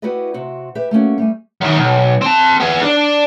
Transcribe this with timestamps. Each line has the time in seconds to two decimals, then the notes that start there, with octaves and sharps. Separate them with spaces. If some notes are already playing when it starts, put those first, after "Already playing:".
0.02 E4 F#4 G4 B4 D5 D#5
0.34 C3 C4 F#4
0.75 G4 B4 E5
0.91 A3 A#3 C#4 F#4
1.18 G3 A3 G#5
1.61 F#2 D#3
1.78 B1
2.22 C4 A5
2.60 B3 G#4
2.83 D4 D5